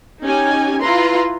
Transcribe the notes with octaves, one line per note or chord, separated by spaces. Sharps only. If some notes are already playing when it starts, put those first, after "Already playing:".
C#4 D#4 G4 G#5
E4 F4 B4 A#5 C6